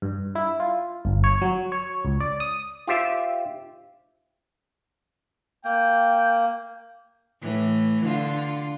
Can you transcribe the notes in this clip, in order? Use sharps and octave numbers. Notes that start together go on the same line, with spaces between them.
G2
E4
F4
G1
C#5
F#3
C#5
C#2
D5
D#6
F4 G4 C5 E5
A#3 G5
A2 E3
D3 F4